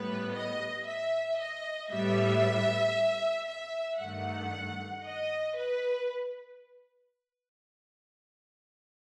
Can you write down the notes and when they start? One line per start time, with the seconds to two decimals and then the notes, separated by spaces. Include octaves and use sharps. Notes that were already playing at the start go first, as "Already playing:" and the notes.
Already playing: A2 G3 B3 B4
0.34 D#5
0.87 E5
1.39 D#5
1.90 A2 G3 B3 E5
3.47 E5
4.00 G2 D#3 A3 F#5
5.04 D#5
5.56 B4